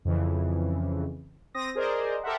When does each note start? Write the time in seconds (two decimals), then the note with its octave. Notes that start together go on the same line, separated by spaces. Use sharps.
0.05 F2 C#3 E3
1.54 C4 D#6 A#6
1.75 G#4 A#4 C5 D5 D#5
2.23 G4 A4 A#4 C5 E5 F#5